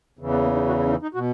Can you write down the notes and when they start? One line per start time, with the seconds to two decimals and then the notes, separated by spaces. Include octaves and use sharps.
0.19 E2 C#3 E3
0.31 B3
0.43 A#3
0.55 D#4
0.67 F#4
0.79 E4
0.86 C#4
0.90 D#4
1.02 D#4
1.14 B2 F#4